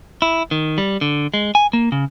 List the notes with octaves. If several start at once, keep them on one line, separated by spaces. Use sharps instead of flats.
E4
D#3
G3
D3
G#3
G#5
A#3
C#3